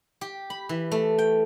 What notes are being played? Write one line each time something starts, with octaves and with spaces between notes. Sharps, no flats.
G4
B5
E3
A3
G5